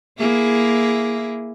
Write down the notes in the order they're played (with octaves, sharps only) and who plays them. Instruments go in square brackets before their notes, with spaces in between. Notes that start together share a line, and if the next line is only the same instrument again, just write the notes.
[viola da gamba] A#3 E4 G#4